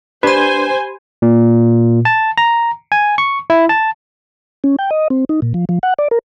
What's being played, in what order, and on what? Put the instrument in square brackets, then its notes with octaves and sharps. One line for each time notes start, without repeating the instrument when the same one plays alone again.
[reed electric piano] D4 B4 [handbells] G4 B5 [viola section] C5 G#5
[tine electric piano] A#2
A5
A#5
G#5
C#6
E4
A5
[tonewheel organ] C#4
G5
D#5
C4
D#4
A#2
F3
F3
F#5
D5
A#4